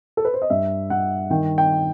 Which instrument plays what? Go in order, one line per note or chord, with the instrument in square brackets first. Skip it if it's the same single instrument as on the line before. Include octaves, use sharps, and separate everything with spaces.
[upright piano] A4
B4
C5
D#5
G2 E5
G2 F#5
D#3 G5
G5